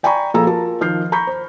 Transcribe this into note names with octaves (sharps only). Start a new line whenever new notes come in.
D5 G5 G#5 A#5 B5 C#6
A#2 F3 G#4 A4 A#5 E6
F4 A#4 A5
D#3 F3 F6 G6 C7
A#5 B5 C#6 G6 B6
C5